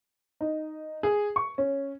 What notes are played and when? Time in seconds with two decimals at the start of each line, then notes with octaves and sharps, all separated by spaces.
0.41 D#4
1.03 G#4
1.36 C#6
1.58 C#4